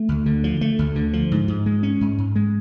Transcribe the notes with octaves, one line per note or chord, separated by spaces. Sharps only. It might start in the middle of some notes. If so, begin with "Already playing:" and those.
Already playing: A3
D2
D3
F3
A3
D2
D3
F3
G#2
G#2
G#3
C#4
G#2
G#2
G#3